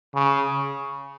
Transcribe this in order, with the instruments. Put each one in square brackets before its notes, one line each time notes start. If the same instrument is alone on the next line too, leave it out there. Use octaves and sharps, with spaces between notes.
[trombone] C#3